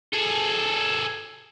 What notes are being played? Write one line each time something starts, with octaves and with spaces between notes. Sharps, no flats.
G#4 A4